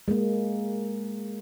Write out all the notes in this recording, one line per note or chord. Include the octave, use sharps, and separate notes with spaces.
G#3 A#3